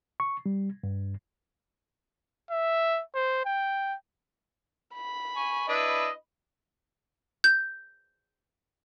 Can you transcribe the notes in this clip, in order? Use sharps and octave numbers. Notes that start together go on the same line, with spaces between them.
C#6
G3
G2
E5
C5
G5
B5
G#5 C#6
D4 E4 B4 D#5
G6